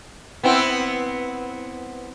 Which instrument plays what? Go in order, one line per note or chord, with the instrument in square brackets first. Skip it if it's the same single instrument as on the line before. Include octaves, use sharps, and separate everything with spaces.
[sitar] B3 C4 E4